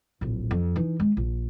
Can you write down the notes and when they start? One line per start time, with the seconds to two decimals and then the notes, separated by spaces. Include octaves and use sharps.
0.21 D1 A#1
0.51 F2
0.76 E3 D#4
1.00 G#3
1.17 A#1